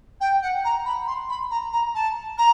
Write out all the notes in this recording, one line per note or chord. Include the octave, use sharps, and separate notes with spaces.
G5
F#5
A#5
B5
C6
B5
A#5
A#5
A5
A#5